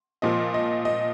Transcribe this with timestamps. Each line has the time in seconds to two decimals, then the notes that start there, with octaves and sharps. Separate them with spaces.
0.22 A#2 F3 D#5
0.54 D#5
0.85 D#5